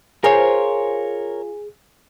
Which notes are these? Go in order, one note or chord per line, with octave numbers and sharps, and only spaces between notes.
F4 G#4 A#4 C5 C#5 F5 G#5